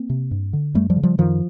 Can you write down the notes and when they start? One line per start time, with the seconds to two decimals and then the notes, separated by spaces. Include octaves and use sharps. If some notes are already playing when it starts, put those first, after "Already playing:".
Already playing: A#3 C4
0.10 C3
0.31 G2
0.53 D3
0.74 F#2 G3 A3
0.90 F3 G3
0.96 C#3
1.03 F3 G3
1.18 F#2 D#3 F3